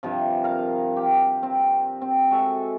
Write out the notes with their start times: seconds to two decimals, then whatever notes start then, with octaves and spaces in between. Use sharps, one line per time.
0.03 G2 C3 F3
0.44 A#4 F5 A#5
0.97 G4
1.43 C4
2.02 C4
2.31 G#3 F#4 A4 E5